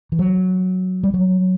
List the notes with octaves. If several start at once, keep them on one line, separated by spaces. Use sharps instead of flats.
E3
F#3
G3
F#3